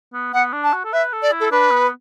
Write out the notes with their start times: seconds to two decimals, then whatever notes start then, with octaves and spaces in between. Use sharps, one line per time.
0.13 B3
0.33 B3 F#5
0.53 D4
0.64 A5
0.73 F#4
0.84 A4
0.93 B4 E5
1.13 A4
1.22 D5
1.31 E4
1.40 A4
1.51 D4 B4
1.71 B3